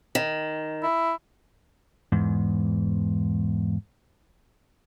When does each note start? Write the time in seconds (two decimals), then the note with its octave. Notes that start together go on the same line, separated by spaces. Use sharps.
0.15 D#3
0.83 E4
2.12 E2 G#2